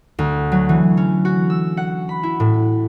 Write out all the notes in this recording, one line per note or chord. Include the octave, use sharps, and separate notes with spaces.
D2
F#3
E3
C#4
F#4
E6
F#5
B5
E4
A2